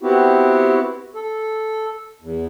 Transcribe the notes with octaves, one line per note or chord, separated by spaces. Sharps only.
B3 C4 E4 F#4 G4
A4
E2